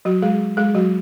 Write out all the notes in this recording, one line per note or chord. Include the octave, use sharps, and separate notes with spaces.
F#3 F#4
G#3 G#4
G#3 G#4
F#3 F#4